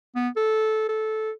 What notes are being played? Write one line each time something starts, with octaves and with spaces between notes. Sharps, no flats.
B3
A4
A4